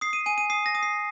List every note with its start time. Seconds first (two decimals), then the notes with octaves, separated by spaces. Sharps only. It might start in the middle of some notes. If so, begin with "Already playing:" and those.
0.01 D#6 C7
0.13 D#7
0.26 G#5 D#7
0.38 D#7
0.50 D#6 C7
0.66 A#6
0.75 D#6
0.83 C7